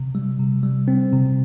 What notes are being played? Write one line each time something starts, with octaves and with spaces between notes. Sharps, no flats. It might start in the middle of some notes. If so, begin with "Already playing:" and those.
Already playing: C3
G3
C3
G3
C4
C3